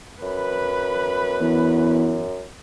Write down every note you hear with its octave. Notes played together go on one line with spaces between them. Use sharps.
F#2 B4 B5
E2